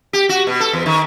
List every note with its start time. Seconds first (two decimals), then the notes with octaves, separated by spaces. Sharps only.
0.13 G4
0.29 F#4
0.47 B2
0.60 A4
0.73 E2
0.86 D#3